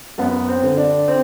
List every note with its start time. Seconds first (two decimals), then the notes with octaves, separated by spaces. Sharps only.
0.18 F#2 B3
0.48 C4
0.64 D3
0.77 D4
1.08 C4